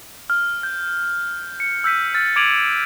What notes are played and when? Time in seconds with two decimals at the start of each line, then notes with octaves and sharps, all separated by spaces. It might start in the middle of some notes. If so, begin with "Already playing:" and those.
0.30 F6
0.63 G6
1.60 C#7
1.84 E6 G6 B6 D#7
2.14 E6 F6 A6
2.36 D6 G#6 D7 D#7 F7 F#7